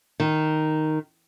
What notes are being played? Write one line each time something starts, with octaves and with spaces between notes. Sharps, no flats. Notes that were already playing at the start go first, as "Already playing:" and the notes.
D#3